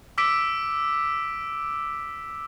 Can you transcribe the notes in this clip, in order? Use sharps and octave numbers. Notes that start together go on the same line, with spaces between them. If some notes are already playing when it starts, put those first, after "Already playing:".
D6 E6 B6 D7